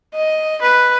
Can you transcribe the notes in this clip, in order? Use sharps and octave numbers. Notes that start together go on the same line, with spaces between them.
D#5
B4